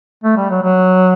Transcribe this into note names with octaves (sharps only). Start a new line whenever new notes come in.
A3
G3
F#3
F#3